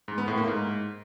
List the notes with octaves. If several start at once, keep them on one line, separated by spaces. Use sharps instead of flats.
G#2
B3
A2
A#3
G#2